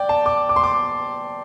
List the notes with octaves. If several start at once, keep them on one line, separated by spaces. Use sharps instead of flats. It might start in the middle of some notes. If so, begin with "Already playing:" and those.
Already playing: D5 G5
A5
D6
D6
C6
D6